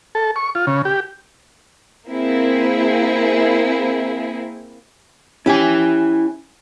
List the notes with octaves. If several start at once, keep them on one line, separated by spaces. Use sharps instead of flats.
A4
C#6
F4
C#3
G4
A#3 C4 E4 G#4
C#4 E4 G4 G#5